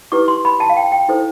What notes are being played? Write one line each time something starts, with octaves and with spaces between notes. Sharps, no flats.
E4 G4 B4 D6
C6
B5
A5
F5
G5
G5
E4 A4 C5